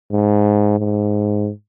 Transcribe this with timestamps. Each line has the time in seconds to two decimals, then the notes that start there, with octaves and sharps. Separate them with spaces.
0.12 G#2
0.79 G#2